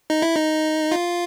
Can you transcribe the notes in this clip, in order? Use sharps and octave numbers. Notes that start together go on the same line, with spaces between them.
D#4
E4
D#4
F4